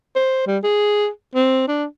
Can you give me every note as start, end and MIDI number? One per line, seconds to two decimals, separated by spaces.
0.15 0.43 72
0.47 0.58 55
0.63 1.08 68
1.35 1.65 60
1.68 1.85 62